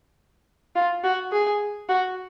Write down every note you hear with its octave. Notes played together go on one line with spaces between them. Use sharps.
F4
F#4
G#4
F#4